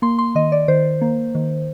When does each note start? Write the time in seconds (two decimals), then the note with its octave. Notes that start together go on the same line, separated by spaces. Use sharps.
0.02 A#3 C6
0.19 C6
0.35 D#3 D#5
0.52 D5
0.68 D#3 C5
1.01 A#3
1.35 D#3